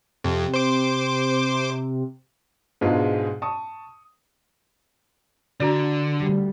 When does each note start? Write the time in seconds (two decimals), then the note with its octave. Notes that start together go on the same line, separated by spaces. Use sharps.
0.24 F2 C3
0.54 C5 D6
2.81 G#2 B2 G#3 D4 F4
3.42 A5 C#6 D#6
5.60 D3 D4 F#4 D5
6.17 D2 G3